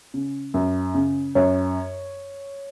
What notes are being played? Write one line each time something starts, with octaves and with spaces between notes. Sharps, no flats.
C#3
F#2
C#3
F#2 C#5